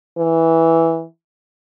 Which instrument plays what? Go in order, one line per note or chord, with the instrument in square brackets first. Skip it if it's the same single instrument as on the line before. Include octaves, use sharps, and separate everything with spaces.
[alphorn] E3